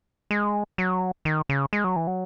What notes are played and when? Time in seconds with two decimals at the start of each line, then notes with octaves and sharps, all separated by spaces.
0.31 G#3
0.78 F#3
1.25 D#3
1.49 C#3
1.73 G#3
1.84 F#3
1.96 E3
2.07 F#3